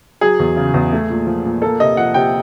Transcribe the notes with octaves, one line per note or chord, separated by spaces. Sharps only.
F#3 G#4
E2
C#3
E2
A3
A#2
F3
A#2
A#3 A4
C3 D#5
F3 F#5
C3 G5